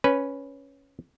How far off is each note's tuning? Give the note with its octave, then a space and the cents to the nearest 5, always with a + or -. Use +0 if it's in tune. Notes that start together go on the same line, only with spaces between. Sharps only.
C#4 +0 B4 +0